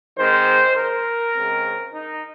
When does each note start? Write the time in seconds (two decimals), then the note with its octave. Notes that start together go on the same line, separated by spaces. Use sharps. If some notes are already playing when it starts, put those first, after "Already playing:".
0.16 D#3 G#3 C4 C5
0.76 A#4
1.34 C#3 G#3 C4
1.93 D#4